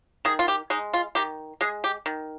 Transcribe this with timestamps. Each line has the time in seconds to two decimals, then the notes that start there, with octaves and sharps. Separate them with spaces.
0.25 D#3 G#4
0.39 F4
0.48 G4
0.70 G#3 D#4
0.94 F4
1.15 D#3 G4
1.61 G#3 G#4
1.84 G4
2.06 D#3